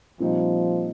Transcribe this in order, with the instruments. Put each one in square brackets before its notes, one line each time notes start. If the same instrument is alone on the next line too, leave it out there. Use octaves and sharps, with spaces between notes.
[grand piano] A#2 G3 C4 D#4 [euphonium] F3